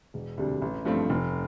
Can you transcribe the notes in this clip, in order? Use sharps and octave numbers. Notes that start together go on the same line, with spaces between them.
E1
D2 C3 G3 D4
A1
G2 F3 A3 C4
F1